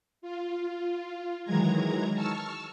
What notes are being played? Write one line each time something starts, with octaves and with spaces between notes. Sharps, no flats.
F4
D#3 E3 F#3 G#3 A#5 G#6
A5 C#6 E6 F6